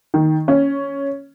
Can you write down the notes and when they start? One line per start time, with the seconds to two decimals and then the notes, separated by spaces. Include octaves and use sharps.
0.14 D#3
0.48 C#4